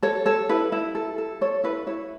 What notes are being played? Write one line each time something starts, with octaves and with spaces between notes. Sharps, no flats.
A4 C#5
A4 C#5
E4 B4
E4
A4
A4
A4 C#5
E4 B4
E4 C#5